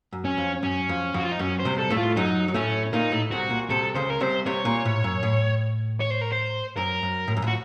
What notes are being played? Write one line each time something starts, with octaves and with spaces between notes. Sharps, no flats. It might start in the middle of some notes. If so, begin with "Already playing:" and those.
F#2
C#4
F2
F#2 C#4
F2
F2 F#4
F4
D#4
F#2 C#4
C5
C2 C3
A4
A2 A3
F4
F#2 F#3 D#4
F#3
A2 A3 C#4
A#2 A#3 D#4
A2 A3
C2 C3 F#4
A#2
C2 C3 A4
C#2 C#3 C5
A#4
C2 C3 C5
C2 C3 C#5
A#2
A2
F#2
A2
C#5
C5
A#4
C5
F#2 A#4
F#2
A2
F#2
A2
F#4